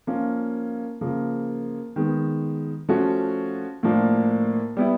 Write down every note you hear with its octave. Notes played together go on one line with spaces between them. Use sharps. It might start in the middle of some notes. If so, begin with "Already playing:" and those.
F3 A#3 C#4 F4
C#3 F3 A#3
D#3 G#3 B3
F3 A3 C#4 F#4
A2 F3 A#3 D4
G3 B3 E4